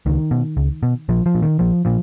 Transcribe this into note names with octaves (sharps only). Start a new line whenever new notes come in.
C#2 D#3
B2
C#2
B2
A#1 F3
F3
A#2
D#3
A#1 F3
A#2 F3